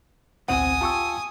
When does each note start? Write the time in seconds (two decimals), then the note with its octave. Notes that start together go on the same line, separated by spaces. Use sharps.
0.48 A1 D2 B2 C4 E4 F#5 G#5 D#6
0.81 F4 G4 A5 C#6 E6